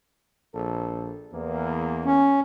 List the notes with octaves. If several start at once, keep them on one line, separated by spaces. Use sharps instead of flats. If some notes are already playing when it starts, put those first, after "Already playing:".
A#1 A4
E2 A#3
C#4